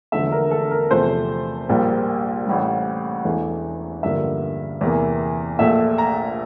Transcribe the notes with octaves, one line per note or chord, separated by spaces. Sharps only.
E1 E2 D3 F3 A3 E5
A#4
A4
A#4
E2 C3 F3 A3 C5
A#1 A#2 G3 A#3
A1 A2 G3
E1 E2 E3 A3
A1 G2 D3 F3 A#3 E5
E2 C3 E3 A#3
A#1 A#2 A3 E5
A#5